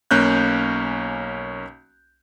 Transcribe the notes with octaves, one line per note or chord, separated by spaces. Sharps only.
B1 A#3 C#4 F#6 G6